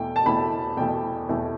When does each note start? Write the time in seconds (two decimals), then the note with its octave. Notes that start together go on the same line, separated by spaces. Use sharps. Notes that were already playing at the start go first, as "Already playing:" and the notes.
Already playing: E2 B2 A3 E4 G5
0.16 A5
0.25 E2 B2 A3 E4 B5
0.77 E2 B2 A3 E4 G5
1.29 E2 B2 A3 E4